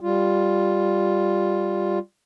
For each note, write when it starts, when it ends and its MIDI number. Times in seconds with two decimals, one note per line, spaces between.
0.01 1.99 55
0.01 1.99 65